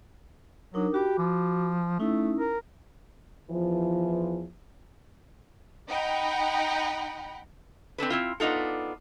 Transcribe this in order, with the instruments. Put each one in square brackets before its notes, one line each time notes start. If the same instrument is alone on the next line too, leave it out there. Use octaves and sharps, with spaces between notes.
[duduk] F#3 [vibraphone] D4 D#4 A#4
[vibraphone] F#4 B5 D6 [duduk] G4
[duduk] F3
[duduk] A3 [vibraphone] C#4 D#4 E4
[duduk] A#4
[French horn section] E2 E3 F3
[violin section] D#4 F#5 G5 A#5 B5
[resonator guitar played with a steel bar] C4 D4 A4 B4
C4 E4 F4
B3 D4 D#4 F4 A4